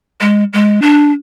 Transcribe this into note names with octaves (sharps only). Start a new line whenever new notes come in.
G#3
G#3
D4